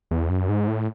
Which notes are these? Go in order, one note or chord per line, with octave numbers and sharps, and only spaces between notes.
E2
F#2
G#2
A2